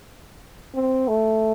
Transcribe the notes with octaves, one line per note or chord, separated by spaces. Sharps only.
C4
A3